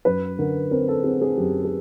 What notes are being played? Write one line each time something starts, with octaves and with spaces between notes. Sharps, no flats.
F#2 B4
D3 A#4
C4 A#4
A4
C4 G#4
G#4
F#2 G4
G#4